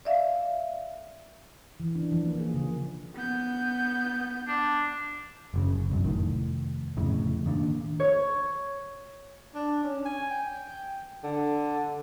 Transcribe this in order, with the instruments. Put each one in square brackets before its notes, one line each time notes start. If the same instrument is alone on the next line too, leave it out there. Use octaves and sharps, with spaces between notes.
[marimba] D5 E5 F5
[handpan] E3
D4
F3
A#3
G#4
C#3
[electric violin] B3 G6
[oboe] D4
[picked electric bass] F#1 A#2 C#3
C2 F#2
F1 A#1 A2 D#3
F1 F2 A2 C#3
D#3 A#3 D4
[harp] C#5
[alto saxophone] D4
C#4
G#5
G5
D3